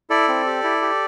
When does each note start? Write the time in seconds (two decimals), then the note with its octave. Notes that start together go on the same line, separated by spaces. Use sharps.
0.10 E4 A4 D5
0.28 C4
0.47 G4
0.64 E4
0.82 G4